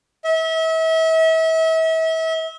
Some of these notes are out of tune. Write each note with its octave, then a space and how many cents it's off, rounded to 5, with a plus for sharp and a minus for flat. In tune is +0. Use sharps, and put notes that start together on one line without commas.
E5 -35